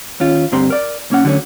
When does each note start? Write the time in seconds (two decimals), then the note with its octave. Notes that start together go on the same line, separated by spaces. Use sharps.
0.20 D#2 C#4 F4
0.52 D2 G2 C4 G4 A#5 C6
0.70 A#4 D5
1.10 B1 A#3 C#4 F#5
1.25 D3 F#3 A3 C#4